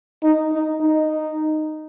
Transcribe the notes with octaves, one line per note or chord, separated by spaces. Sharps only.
D#4
D#4
D#4